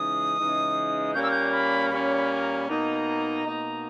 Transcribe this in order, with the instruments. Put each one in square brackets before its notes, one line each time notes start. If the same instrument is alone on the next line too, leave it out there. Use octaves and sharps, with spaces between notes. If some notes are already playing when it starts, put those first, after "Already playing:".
Already playing: [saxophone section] C#3 E3 G#3 D#4 [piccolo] D#6
[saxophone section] C#3 E3 G#3 D#4
[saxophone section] A#2 G3 A#3 C#4 [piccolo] G6
[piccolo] E6
G6
B5
[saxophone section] A#2 G3 A#3 C#4 [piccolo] B5
[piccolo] B5
G#5
A#5
B5
[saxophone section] B2 A#3 D#4 [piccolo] A#5
[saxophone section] B2 A#3 D#4